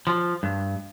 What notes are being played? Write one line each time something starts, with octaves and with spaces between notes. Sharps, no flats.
F3
G2